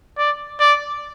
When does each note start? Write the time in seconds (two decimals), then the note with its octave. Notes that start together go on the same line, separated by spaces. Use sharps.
0.18 D5
0.60 D5